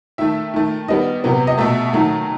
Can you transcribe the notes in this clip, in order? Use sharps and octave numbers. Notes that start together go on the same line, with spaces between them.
D#3 A3 E5
D#3 A3
D#3 G3 B3 D#5
C3 F#3 B3
D#5
B2 A3 E5
D#3 F#3 A3